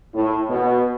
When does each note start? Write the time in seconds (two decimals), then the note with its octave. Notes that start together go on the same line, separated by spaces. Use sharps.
0.14 A2
0.50 B2